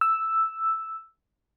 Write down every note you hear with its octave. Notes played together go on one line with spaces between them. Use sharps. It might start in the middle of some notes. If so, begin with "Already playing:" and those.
E6